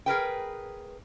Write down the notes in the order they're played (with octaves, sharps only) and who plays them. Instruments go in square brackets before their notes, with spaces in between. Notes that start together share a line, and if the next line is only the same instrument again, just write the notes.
[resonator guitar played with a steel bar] G#4 A#4 B4 G5